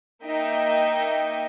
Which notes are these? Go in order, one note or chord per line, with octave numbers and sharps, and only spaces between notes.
A#3 D#4 D#5 E5 G5